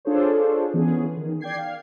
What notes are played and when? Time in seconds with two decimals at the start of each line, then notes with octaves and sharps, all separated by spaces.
0.05 D4 F4 G#4 A4 C5 C#5
0.74 E3 B3 C#4 G#4
1.17 D#3
1.41 D5 G5 G#6 C7
1.58 F5